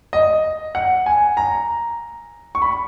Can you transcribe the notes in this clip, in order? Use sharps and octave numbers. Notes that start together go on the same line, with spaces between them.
D#5
F#5
G#5
A#5
C#6
B5